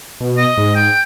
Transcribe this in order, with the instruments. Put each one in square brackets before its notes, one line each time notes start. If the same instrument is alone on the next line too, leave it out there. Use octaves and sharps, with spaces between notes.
[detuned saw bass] B2
[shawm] D#5
[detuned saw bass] G#2
[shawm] G5